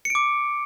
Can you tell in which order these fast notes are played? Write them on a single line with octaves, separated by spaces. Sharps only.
C#7 D7 D6